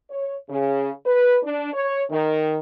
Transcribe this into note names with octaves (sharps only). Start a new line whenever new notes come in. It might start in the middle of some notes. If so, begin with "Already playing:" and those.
C#5
C#3
B4
D4
C#5
D#3